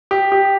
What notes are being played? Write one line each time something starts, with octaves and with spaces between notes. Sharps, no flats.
G4
G4